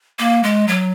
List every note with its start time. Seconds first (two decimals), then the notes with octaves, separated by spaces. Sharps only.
0.19 A#3
0.44 G#3
0.68 F#3